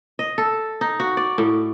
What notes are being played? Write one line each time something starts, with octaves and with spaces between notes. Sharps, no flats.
D#5
A4
D#4
F#4
D5
A2